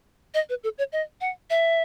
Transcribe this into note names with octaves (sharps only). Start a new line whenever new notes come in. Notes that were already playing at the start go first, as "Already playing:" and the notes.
D#5
B4
A4
C#5
D#5
F#5
E5